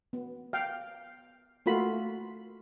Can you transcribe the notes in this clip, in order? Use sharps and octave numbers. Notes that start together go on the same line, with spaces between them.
B3
F5 G5
A3 A#3 F4 F#4 B5